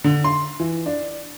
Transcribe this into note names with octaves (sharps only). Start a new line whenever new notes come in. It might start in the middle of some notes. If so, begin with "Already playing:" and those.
D3
C6
E3
D4